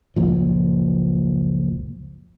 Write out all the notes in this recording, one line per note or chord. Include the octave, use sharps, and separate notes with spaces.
F#1 C#2 A#2 F3